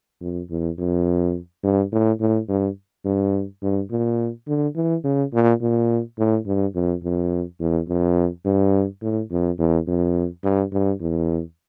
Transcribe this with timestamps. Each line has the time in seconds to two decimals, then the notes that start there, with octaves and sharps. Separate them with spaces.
0.21 F2
0.50 E2
0.78 F2
1.64 G2
1.92 A2
2.20 A2
2.49 G2
3.05 G2
3.63 G2
3.91 A#2
4.48 D3
4.76 E3
5.04 C#3
5.33 A#2
5.61 A#2
6.18 A2
6.46 G2
6.75 F2
7.03 F2
7.60 E2
7.88 F2
8.45 G2
9.02 A2
9.31 F2
9.59 E2
9.88 F2
10.44 G2
10.72 G2
11.01 E2